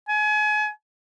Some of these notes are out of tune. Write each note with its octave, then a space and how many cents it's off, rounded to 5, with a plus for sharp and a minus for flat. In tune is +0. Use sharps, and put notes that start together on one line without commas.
G#5 +30